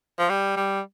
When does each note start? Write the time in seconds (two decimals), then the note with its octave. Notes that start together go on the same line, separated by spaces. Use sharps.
0.19 F3
0.29 G3
0.56 G3